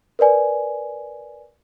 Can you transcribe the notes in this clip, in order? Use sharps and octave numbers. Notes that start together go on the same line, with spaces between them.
A#4 B4 D5 G#5